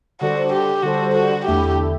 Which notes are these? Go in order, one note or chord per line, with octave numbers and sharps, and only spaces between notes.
D3 G3 D4 F#4 A4 C5
G4
D3 G3 D4 F#4 A4 C5
F#4
E2 D3 A3 E4 G4 A4